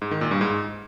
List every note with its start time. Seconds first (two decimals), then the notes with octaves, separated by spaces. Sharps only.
0.02 G#2
0.11 D#3
0.21 A#2
0.31 G2
0.41 G#2